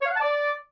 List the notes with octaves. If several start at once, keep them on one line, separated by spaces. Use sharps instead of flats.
C#5
F5
F#5
A5
D5